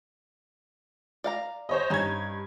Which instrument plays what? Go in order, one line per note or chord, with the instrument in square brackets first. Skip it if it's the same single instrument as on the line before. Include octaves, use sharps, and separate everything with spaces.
[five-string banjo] D5 F5 A#5
[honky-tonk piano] C5 C#5 D#5
[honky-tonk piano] G2 G#6 [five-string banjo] C#4 D#4